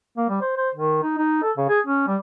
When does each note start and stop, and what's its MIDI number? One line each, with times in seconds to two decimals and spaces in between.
0.17 0.27 58
0.29 0.40 55
0.41 0.53 72
0.57 0.70 72
0.75 1.00 51
1.03 1.13 63
1.18 1.39 63
1.42 1.52 69
1.57 1.67 49
1.69 1.80 68
1.87 2.06 61
2.07 2.16 55